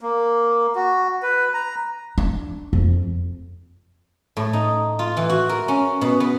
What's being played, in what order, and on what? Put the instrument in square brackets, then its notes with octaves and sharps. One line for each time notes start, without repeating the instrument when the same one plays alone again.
[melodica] A#3
F#4
B4
A#5
[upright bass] D4
F2
[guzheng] A2
D#4
F4
E3
F#4
A#4
C#4
B2
B3